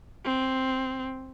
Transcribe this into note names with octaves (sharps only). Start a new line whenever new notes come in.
C4